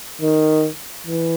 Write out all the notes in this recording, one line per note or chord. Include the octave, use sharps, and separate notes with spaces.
D#3
E3